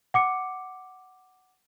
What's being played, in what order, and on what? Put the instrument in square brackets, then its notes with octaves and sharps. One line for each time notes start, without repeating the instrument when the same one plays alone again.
[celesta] F#5 D6 C#7